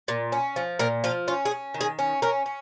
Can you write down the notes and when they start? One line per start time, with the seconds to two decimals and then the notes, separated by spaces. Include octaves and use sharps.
0.08 A#2
0.32 C#4
0.56 F3
0.79 A#2 A#4
1.04 F3 F4
1.28 C#4 F4
1.45 G#4
1.51 C#4
1.74 D#3
1.81 G#4
1.99 C#4
2.22 C#4 A#4
2.46 C#4